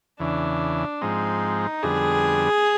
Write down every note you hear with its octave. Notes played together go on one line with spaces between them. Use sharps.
E2 C#3 E3 D4
G#2 F3 G#3 C4 D#4
F2 D3 G3 B3 D4 G#4